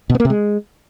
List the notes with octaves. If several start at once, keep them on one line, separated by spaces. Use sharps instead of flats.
B2
B3
A#3
C3
G#3